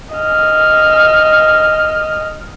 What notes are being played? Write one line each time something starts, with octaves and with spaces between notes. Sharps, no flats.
D#5 F6